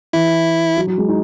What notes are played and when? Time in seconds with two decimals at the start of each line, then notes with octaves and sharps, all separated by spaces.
0.13 E3 E4
0.77 F#3
0.87 F#3
0.98 G#3
1.08 D#4